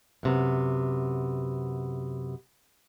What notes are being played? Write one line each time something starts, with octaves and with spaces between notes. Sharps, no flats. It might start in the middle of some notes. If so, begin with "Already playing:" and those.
F#2 C3 B3